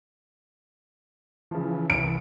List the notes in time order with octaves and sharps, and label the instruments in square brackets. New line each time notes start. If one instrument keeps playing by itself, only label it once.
[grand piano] C#3 F3 [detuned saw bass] E3
[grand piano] C2 [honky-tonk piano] D7